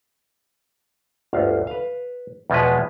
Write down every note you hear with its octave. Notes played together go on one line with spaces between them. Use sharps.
G1 D2 F5
B4 F5
E2 B2 F3 G#3 B4